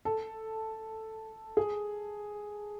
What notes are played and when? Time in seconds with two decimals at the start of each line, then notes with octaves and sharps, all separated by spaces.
0.05 A4
1.57 G#4